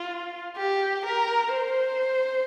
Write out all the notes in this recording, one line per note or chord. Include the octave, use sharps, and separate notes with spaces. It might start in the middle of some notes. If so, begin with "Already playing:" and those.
Already playing: F4
G4
A#4
C5